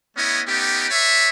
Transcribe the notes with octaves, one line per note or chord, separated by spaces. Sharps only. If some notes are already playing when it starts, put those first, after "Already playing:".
A3 B3 C#4 E4 C#5 D#5
A3 B3 C#4 D#4 G4
B4 C#5 D5 E5